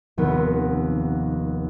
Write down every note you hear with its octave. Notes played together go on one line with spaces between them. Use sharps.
F1 D#2 B3